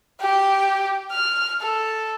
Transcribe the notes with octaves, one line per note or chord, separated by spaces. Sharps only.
G4
F6
A4